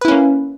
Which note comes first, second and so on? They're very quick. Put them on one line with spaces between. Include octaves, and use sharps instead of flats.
B4 E4 C#4 A#3